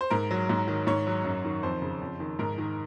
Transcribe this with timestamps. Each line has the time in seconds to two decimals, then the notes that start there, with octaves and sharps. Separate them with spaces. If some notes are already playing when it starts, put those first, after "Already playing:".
0.01 C5
0.10 G#2 A#4
0.31 F#3
0.49 G#2
0.68 D#3
0.87 G#2 C#5
1.07 F#3
1.25 F#2
1.45 D#3
1.63 F2 C5
1.82 C#3
2.02 F2
2.20 D#3
2.39 G#2 A#4
2.58 D#3